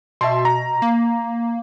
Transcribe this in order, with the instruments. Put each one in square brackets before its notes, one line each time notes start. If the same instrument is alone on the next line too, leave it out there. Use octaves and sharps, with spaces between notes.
[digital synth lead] B2 [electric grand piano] E5 A5 C6
[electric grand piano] A#5
[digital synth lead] A#3